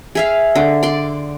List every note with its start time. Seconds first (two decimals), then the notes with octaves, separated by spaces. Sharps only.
0.15 G#4 E5 F5
0.56 D3
0.83 D5 C6